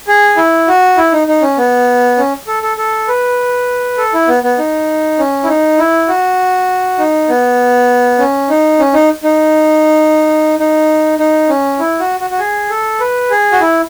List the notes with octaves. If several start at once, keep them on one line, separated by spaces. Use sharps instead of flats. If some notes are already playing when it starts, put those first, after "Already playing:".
G#4
E4
F#4
E4
D#4
D#4
C#4
B3
C#4
A4
A4
A4
B4
A4
E4
B3
B3
D#4
C#4
E4
D#4
E4
F#4
D#4
B3
C#4
D#4
C#4
D#4
D#4
D#4
D#4
C#4
E4
F#4
F#4
F#4
G#4
A4
B4
G#4
F#4
E4